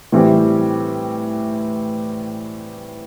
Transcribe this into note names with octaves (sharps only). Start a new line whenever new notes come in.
A2 E3 G3 C4 G4